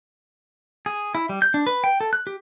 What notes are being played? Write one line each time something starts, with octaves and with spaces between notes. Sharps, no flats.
G#4
E4
G3
G6
D4
B4
G5
A4
F#6
G4